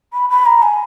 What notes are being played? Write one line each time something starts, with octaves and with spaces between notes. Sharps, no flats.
B5
B5
A#5
G#5